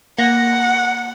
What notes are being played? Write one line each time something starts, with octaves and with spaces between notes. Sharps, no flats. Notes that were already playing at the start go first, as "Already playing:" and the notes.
A#3 F#5 A#6